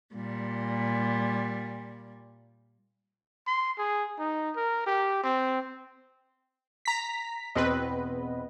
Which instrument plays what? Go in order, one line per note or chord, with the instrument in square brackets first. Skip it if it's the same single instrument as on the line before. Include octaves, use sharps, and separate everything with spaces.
[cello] A#2 G3
[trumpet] C6
G#4
D#4
A#4
G4
C4
[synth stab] A#5 B6
[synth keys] E2 B3 D#5 [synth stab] B2 C4 B4